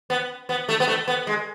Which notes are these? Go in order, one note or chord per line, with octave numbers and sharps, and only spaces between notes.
B3
B3
A3
B3
A3
B3
G#3